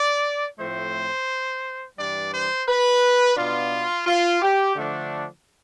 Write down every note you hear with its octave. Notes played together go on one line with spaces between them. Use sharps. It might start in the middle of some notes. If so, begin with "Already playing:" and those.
Already playing: D5
A2 F3 A3 C4 C5
G2 E3 G3 D4 D5
C5
B4
B2 B3 D4 F4
F4
G4
D3 F3 A3 D4